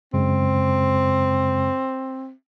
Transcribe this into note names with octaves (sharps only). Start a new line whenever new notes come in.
F#2 C#3 G#3 C4